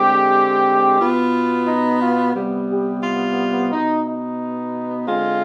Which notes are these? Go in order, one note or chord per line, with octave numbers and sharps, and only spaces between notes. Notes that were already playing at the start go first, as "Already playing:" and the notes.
Already playing: D3 G#3 C4 G4
B2 B3 F4
D#4
F4
C3 G3 B3
G4
F4
B2 B3 D#4
D#4
D3 G#3 C4 F4